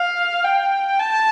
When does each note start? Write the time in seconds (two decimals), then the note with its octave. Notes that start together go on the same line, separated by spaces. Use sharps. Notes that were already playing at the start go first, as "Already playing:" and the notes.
Already playing: F5
0.44 G5
0.99 A5